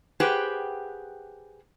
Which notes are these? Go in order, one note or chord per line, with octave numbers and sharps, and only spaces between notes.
G4 G#4 B4 C5 F#5 G5